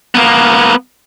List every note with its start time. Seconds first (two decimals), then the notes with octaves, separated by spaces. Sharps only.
0.15 A#3 B3